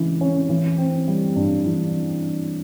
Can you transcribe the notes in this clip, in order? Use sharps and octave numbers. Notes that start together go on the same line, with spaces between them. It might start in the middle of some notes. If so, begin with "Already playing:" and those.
Already playing: C#3 E3 G#3
C#4
E3
C4
G3
G2
E3